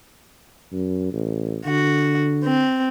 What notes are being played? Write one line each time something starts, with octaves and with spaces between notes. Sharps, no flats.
F#2
A1
D3 F#4
C4